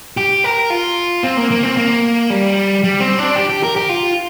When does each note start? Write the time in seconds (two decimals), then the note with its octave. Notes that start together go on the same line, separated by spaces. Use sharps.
0.17 G4
0.44 A#4
0.70 F4
1.24 C4
1.37 A#3
1.51 A#3
1.63 C4
1.77 A#3
2.30 G3
2.83 G3
3.00 C4
3.19 D4
3.36 G4
3.49 G4
3.63 A#4
3.76 G4
3.89 F4